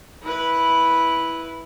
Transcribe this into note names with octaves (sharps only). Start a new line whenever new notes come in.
E4 B4